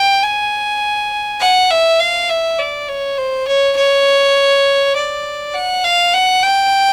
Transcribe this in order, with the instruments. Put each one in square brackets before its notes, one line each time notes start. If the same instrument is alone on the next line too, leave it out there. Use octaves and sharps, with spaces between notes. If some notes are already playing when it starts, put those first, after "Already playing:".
Already playing: [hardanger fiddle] G5
G#5
F#5
E5
F5
E5
D5
C#5
C5
C#5
C#5
D5
F#5
F5
F#5
G5